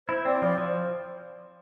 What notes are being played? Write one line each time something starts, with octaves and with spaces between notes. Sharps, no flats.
E4 C5
C4 D5
F3 D5
F3